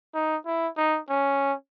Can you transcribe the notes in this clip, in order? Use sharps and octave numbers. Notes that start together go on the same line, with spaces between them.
D#4
E4
D#4
C#4